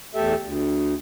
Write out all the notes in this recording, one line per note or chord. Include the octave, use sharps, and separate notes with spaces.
E2 A3 G4 A4 E5
D2